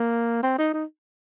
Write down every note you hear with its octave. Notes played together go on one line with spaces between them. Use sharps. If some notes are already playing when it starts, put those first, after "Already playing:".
Already playing: A#3
C4
D#4
D#4